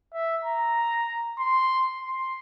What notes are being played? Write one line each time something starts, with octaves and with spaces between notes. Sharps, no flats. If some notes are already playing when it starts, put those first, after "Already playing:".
E5
A#5
C6
C6